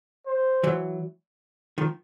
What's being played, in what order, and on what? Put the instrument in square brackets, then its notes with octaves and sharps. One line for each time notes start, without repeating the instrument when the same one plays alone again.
[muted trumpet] C5
[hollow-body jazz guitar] E3 F#3
D#3 F3